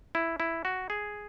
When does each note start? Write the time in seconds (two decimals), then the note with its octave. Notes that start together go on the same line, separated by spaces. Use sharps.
0.15 E4
0.40 E4
0.65 F#4
0.90 G#4